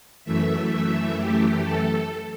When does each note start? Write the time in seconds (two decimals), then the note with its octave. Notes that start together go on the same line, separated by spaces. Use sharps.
0.24 F#2 E3 A3 E5
0.71 E5
1.18 G4
1.64 A4